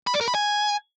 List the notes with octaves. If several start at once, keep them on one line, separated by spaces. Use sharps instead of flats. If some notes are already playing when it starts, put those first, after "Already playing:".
B5
D5
A#4
B5
G#5